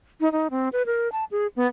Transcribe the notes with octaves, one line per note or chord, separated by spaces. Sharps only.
D#4
D#4
C4
B4
A#4
A5
G#4
B3